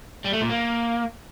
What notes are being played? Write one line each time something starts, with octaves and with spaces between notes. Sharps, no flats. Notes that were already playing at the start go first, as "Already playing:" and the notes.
G3
A3
A#2
A#3